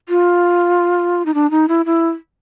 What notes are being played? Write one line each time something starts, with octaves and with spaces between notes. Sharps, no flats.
F4
D#4
D4
D#4
E4
E4